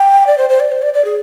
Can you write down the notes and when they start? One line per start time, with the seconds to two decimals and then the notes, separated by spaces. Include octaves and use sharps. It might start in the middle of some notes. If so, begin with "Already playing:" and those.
Already playing: G5
0.27 D5
0.38 C5
0.49 C5
0.60 D5
0.72 C5
0.82 D5
0.94 D5
1.05 G#4